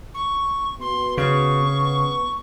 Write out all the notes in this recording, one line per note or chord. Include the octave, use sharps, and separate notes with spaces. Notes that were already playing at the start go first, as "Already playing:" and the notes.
C#6
B3 F#4 C6
C#3 C#6
B3